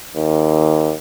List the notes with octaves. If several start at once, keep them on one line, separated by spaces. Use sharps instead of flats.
D#2